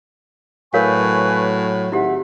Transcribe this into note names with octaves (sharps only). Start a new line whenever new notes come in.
A2 F#3 A#4 B4 C#5 F5 G#5 C#6
G#1 E4 G4 E5 F#5